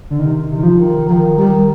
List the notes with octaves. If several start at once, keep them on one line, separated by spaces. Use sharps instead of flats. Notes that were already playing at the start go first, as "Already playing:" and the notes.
D3
C3 D#3
C3
D#3
F3
D#3
D#3 F3
D#3 G3